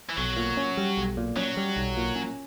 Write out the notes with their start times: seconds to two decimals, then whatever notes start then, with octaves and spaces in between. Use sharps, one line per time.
0.10 E3
0.17 B1 F#3
0.37 A#2
0.57 C#4
0.77 G3
0.97 B1
1.17 A#2
1.36 F#3 C#4
1.57 G3
1.77 B1
1.97 A#2
2.16 C#4